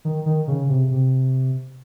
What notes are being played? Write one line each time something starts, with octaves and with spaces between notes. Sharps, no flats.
D#3
D#3
C#3
C3
C3